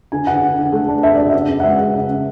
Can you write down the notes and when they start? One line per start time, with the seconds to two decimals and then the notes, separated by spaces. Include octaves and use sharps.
0.12 D3 G#5
0.27 D3 F#5
0.43 D3
0.59 D3
0.72 A3
0.88 D4
1.03 D4 E5
1.15 D4 D5
1.29 C#3 E5
1.48 C#3
1.60 F#5
1.63 G#3 E5
1.79 G#3
1.94 C#3
2.09 C#3